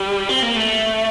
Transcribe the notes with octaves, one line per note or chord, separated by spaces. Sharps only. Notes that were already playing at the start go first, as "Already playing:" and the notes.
Already playing: G3
C4
A#3
A3